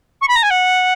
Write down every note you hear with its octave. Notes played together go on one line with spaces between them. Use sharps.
C#6
B5
A#5
G#5
F#5